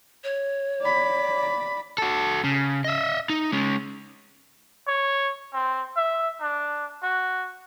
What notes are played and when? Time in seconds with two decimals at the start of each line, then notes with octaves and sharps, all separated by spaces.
0.24 C#5
0.81 D5 B5
1.98 F#4 A4
2.44 C#3
2.84 D#5 E5
3.30 D#4
3.53 G#3 C#4
4.87 C#5
5.53 C4
5.97 E5
6.41 D4
7.03 F#4